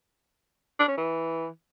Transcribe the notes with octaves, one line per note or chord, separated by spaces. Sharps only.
D4
C#4
E3